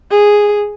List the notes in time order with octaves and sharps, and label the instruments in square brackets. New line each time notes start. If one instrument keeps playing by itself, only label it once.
[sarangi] G#4